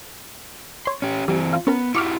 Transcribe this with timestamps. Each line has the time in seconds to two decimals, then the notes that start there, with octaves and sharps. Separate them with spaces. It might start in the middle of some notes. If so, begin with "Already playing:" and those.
0.85 C#5 C6
1.02 C#4 G4
1.28 E3 G3 C4
1.53 F4
1.67 B3 C#4 A#4
1.95 E4 F#4 G4 C#6 D6 F6